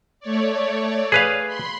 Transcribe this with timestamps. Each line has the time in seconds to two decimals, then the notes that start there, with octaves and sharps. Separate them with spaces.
0.20 A3 C#5 D5
1.12 G#4 B4 F5
1.46 B5 C6